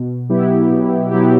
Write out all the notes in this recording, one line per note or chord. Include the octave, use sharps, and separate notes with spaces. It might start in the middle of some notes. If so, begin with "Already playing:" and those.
Already playing: B2
F#3 B3 E4 G4
B2
F#3 B3 E4 G4